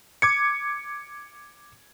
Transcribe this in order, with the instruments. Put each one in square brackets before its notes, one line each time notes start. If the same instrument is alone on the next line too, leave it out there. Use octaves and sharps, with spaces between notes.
[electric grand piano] D6 G#6 C#7